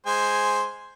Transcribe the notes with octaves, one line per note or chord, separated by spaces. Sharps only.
G#3 C5 G#5